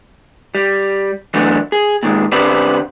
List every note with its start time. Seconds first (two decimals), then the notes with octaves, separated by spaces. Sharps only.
0.55 G3
1.34 E3 F#3 A3 B3 D4
1.72 G#4
2.03 A#2 D#3 G#3
2.32 D3 C4 G4 B4 C5 D5